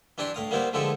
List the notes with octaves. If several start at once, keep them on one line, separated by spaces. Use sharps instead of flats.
E3 D4 E4 G4 D5 C6
A2 F5 D#6
G3 A#3 B3 E4 G4 C5
D3 F3 G#3 E4 G4 A4